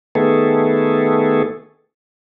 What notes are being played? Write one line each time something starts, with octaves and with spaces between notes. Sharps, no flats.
D#3 A3 B3 G#4 A4